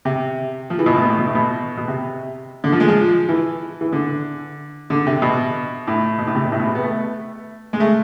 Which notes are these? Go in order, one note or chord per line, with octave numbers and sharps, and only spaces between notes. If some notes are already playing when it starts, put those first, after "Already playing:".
C3
F3
E3
B2
A2
B2
A2
B2
A2
B2
B2
C3
D3
F3
G#3
F3
E3
E3
D3
D3
C3
B2
A2
B2
A2
C3
B2
A2
B2
C3
B3
A3
G#3
A3